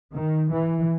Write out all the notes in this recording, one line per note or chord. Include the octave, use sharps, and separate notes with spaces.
D#3
E3